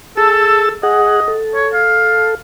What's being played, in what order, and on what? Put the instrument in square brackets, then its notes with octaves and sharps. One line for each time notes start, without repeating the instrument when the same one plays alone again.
[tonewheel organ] G#4 A5 E6 [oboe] A4
[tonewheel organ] G#4 F#5 [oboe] D#5
[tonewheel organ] A4
[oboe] C#5
F5